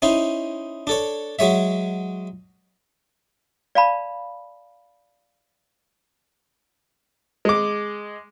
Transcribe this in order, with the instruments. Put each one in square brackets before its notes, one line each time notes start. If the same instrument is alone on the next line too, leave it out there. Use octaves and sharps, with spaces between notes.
[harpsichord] C#4 D#4 E4 C5
D4 A4 C#5
F#3 G#3 C#5 E5
[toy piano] D5 F5 A5 B5
[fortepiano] G#3 D6